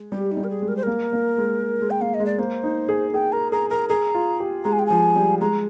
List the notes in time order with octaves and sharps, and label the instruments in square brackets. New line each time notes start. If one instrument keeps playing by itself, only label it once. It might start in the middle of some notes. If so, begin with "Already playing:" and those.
Already playing: [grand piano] G#3
[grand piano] G3 [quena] G4
[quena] D#4
[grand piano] G3
[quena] A#4
G#4
[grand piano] G#3
[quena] A#4
C5
[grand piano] A#3 [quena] A#4
[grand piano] A#3
G#3
G#3
[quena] G5
[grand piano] A#3 [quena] F5
[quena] D#5
[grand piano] G#3
[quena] D5
[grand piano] A#3 [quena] C5
[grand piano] D#4
G#4
[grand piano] G#4 [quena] G5
[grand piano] A#4 [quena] A#5
[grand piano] G#4 [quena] A#5
[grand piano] A#4 [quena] A#5
[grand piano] G#4 [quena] A#5
[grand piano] F4
G4
[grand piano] G#3 [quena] A#5
[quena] G#5
G5
[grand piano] F3 [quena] G#5
[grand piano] G3
[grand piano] G#3 [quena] A#5